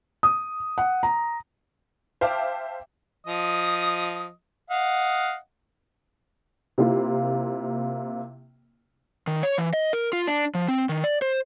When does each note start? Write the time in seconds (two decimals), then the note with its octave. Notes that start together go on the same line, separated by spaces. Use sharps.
0.23 D#6
0.78 F#5
1.03 A#5
2.21 C5 E5 F5 G5 A5 D6
3.27 F3 D#5 D#6
4.70 D#5 F5 F#5
6.78 C3 A#3 E4 F4
9.27 D#3
9.43 C#5
9.58 E3
9.73 D#5
9.93 A#4
10.13 F4
10.27 D4
10.54 F3
10.68 C4
10.89 D#3
11.04 D5
11.22 C5